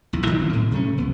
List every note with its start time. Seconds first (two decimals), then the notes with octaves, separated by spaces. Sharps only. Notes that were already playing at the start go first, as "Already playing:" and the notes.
0.13 B1 E2
0.26 A2 D#3 F#3 G3
0.39 F1 A3 C4
0.53 A2
0.72 C3 F#3 A3 C#4
0.97 E1 C#2 B3